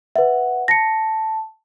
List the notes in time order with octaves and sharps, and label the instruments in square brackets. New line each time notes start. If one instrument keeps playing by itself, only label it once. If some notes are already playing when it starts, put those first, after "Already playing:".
[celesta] B4 E5 [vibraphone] F#5
[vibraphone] A5 [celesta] A#6 C#7